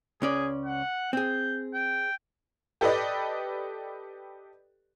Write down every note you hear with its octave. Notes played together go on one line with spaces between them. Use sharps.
C#2 C#4 G#4 D5
F#5
C4 G#4 G6
G5
G4 A4 B4 D5 D#5